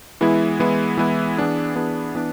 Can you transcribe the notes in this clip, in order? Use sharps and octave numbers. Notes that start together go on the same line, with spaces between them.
E3 G#3 B3 E4
E3 G#3 B3 E4
E3 G#3 B3 E4
E3 B3 D4 G#4
E3 B3 D4 G#4
E3 B3 D4